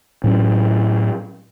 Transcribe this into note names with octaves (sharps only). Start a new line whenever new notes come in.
A2 F#3 C#4